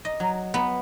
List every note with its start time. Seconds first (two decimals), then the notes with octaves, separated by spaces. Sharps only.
0.05 D#5
0.20 F#3
0.54 B3